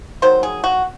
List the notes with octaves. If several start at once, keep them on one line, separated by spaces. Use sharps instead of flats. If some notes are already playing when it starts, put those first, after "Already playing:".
D#3 F#3 C5
G#4
F#4